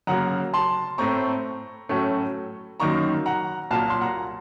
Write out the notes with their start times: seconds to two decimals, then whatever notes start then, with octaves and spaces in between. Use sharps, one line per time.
0.07 F#2 C#3 F#3 A#3 F#5 A#5
0.54 A5 C6
0.98 A2 A3 C4 A#5 C#6
1.89 A2 F#3 A3 C#4
2.80 F#2 D#3 A#3 D#4 A#5 C#6
3.26 F#5 A#5
3.71 C2 A#2 F#3 A#3 F5 A5
3.90 C6
4.01 F#5 A#5